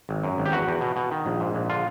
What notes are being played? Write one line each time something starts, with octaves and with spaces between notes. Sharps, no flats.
G#1
F#2
G#1
G4
E2 F#4
E2
B2
B2
D#3
A#1
G#2
A#1
D3 F4